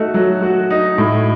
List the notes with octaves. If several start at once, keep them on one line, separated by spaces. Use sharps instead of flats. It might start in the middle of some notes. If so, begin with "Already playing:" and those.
Already playing: A3 D#4 F#4
F#3
F#4
D#4
A2